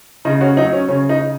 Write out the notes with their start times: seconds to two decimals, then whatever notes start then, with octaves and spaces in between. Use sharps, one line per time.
0.25 C#3 D#4
0.41 C#4 F#4
0.57 F#3 D#4
0.73 C#4
0.88 C#3 C#4
1.09 D#4